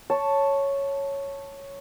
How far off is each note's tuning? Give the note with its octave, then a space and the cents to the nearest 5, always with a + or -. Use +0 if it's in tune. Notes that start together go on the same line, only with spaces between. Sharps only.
C#5 +0 A5 +0